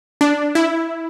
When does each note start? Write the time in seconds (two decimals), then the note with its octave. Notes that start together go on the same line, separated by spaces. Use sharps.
0.21 D4
0.55 E4